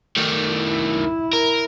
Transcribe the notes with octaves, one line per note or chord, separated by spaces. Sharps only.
D#3 A3
E4
A#4